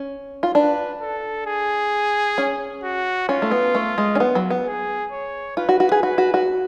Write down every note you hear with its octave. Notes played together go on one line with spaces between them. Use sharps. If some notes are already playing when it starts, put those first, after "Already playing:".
Already playing: C#4
F4
D4 B4
A4
G#4
C#4
F#4
C#4 F4
A3
B3
A3
G#3
C#4
B3
F#3
B3
G#4
C#5
F4 B4
F#4
F#4
G#4
F#4 B4
F#4
F#4